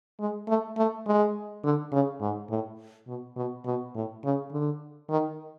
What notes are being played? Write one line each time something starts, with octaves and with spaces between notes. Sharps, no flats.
G#3
A3
A3
G#3
D3
C#3
G#2
A2
B2
B2
B2
A2
C#3
D3
D#3